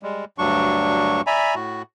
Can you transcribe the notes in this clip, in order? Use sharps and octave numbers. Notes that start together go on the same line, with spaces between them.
G3 G#3
D2 G2 F#3 D4 C#6
D5 E5 G#5 A#5 B5
A2 F#4